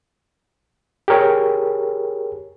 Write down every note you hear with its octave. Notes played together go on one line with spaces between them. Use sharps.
G4 G#4 A#4 C#5